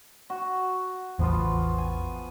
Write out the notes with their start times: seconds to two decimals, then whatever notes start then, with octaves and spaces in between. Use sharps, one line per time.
0.30 F#4
1.19 A1 E2 F3 B3 F4
1.78 G#5